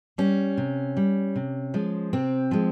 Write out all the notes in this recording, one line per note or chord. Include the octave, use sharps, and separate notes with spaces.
G3 C#4
C3
G3
C3
F3 G#3
C3 C4
F3 G#3